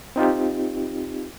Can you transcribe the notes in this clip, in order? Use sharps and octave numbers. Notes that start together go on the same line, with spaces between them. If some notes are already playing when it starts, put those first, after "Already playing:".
C4 D#4 F4 G4